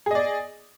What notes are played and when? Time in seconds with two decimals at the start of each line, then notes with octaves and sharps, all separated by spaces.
0.06 G#4
0.11 D#5
0.15 D5